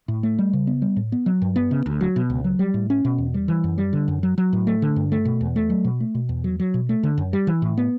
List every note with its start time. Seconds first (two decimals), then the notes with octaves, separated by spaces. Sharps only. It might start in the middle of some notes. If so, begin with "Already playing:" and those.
0.08 A2
0.23 A3
0.39 G3
0.53 C#3
0.67 B3
0.82 G3
0.96 A2
1.12 B3
1.26 F#3
1.42 G2
1.56 B3
1.71 C#3
1.86 D2
2.01 F#3
2.16 B2
2.30 C#2
2.44 F#3
2.59 G3
2.74 A2
2.90 C#4
3.05 B2
3.18 E2
3.34 G3
3.48 E3
3.64 F#2
3.78 G3
3.93 D3
4.08 F#2
4.23 F#3
4.38 F#3
4.53 A2
4.67 A3
4.82 D3
4.96 G2
5.12 A3
5.25 B2
5.41 E2
5.56 A3
5.70 F#3
5.84 B2
6.00 A3
6.15 B2
6.29 E2
6.44 F#3
6.60 F#3
6.74 B2
6.89 A3
7.03 D3
7.18 F#2
7.33 G3
7.47 E3
7.62 A2
7.78 B3